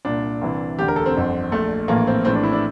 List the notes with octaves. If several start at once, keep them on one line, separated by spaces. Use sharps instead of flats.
C2 A#2 D4
C2 C3 E3
E1 D2 D3 G4
A#4
A4
C4
G1 F2 D3
A#1 A#2 A3
A#1 A2 E3 A#3
C4
A#1 A2 E3 C4
D4
E4
D4